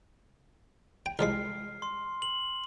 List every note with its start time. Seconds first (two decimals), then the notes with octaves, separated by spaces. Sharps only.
1.06 G5
1.19 C2 F3 G#3 F6 C7
1.82 C6
2.22 F#7